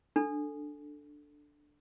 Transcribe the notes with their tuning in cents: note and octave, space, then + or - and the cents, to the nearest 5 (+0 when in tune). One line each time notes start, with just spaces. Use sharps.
D4 +5 A4 +0